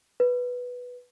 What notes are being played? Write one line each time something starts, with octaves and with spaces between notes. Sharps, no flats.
B4